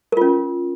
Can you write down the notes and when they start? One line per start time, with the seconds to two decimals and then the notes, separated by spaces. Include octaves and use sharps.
0.12 A#4
0.17 F4
0.21 C#4